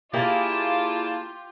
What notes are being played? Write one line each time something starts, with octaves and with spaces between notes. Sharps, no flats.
A#3 E4 F4 G4 G#4 D5 A5